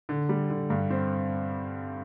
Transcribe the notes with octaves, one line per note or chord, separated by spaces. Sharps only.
D3
G3
D3
G2
C4